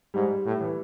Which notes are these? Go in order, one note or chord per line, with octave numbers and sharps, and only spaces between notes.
G#2 G3
A2
E3